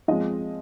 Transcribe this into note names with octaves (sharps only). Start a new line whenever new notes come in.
F3 G#3 C4 D#5